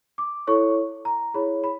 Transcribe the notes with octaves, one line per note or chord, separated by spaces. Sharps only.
D6
E4 A4 C#5 C#6
A#5
E4 G#4 C#5 B5
B5